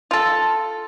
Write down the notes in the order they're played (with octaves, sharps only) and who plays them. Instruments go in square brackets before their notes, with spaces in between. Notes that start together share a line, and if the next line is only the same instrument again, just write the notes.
[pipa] F4 A4